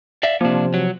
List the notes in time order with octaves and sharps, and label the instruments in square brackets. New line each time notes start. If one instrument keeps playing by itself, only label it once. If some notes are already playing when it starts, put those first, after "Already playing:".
[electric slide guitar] D5 E5 F5
[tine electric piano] C3 F3 [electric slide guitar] A#3 D4
[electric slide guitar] F#3